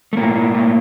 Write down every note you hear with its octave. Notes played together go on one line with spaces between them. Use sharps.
A3
A2 A#3
A2
A2